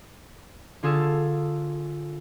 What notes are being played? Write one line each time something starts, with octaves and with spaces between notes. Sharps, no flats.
D3 F4 G#4 A4